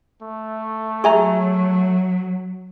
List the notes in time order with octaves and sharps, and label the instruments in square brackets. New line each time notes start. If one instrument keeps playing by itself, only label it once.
[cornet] A3
[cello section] F#3 [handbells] G#4 G#5 A#5 [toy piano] E5 C#6